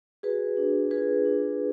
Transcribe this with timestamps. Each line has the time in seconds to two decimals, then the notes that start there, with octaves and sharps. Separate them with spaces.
0.23 F#4 G#4 B4
0.57 D4
0.91 F4 G#4 B4
1.26 D4